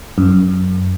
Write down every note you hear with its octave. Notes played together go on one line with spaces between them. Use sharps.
F#2